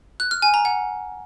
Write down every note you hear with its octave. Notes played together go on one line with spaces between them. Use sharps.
F#6
F6
G#5
A#5
F#5